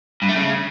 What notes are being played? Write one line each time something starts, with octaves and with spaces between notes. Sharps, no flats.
G2
A3
C#3